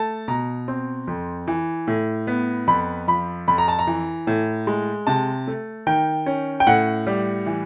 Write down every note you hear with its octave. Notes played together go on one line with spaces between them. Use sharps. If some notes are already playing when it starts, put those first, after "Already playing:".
Already playing: A3 A5
B2 A#5
C4
F2
E3
A2
B3
F2 B5
F3 B5
F2 B5
A#5
A5
A#5
E3
A2
G#3
C3 A5
A3
D#3 G5
C#4
G5
A2 F#5
G3
E3